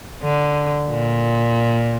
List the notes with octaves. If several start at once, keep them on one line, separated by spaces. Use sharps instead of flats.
D3
A#2